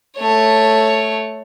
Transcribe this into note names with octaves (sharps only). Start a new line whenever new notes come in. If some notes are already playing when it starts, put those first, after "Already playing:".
A3 C#5